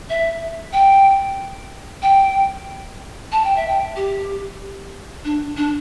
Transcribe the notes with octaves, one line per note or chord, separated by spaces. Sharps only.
E5
G5
G5
A5
G5
E5
G5
G4
D4
D4